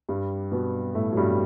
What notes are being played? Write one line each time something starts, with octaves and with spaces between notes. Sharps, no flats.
G2 G3
B2 B3
A2 A3
F#3
G2 G3